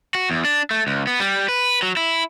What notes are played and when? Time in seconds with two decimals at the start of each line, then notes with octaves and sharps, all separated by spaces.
0.15 F#4
0.30 E2
0.45 D4
0.71 A3
0.87 C#2
1.07 B3
1.20 G3
1.48 B4
1.83 F#3
1.97 E4